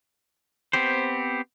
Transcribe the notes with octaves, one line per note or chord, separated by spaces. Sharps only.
B3 C4 G4 C5